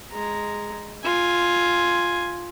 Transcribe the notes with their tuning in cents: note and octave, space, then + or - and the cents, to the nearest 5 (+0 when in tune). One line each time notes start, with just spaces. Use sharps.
G#3 +0 A#5 +0
F4 +0 G#5 +0